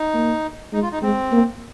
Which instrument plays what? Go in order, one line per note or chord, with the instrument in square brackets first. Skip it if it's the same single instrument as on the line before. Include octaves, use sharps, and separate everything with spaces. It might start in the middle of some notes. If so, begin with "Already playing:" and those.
Already playing: [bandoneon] D#4
[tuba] A#3
[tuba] G#3 [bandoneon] D#4
[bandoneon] F4
D#4
[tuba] G#3 [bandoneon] C4
[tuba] A#3